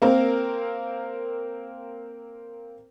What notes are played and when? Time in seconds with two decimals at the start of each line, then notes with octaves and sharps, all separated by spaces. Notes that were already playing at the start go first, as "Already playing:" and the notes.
0.02 A#3 C4 A#4